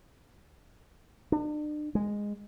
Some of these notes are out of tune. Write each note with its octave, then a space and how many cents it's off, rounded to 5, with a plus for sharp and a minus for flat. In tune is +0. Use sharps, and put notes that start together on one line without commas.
D4 +40
G#3 -10